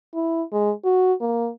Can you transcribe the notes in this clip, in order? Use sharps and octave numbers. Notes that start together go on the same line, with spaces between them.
E4
G#3
F#4
A#3